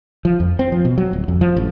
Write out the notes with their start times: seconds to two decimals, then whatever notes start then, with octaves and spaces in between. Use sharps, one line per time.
0.25 F3
0.40 F2
0.59 C4
0.72 F3
0.85 B2
0.98 F#3
1.13 D1
1.28 F2
1.41 F3
1.56 A1